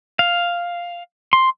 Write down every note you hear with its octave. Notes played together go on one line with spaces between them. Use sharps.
F5
C6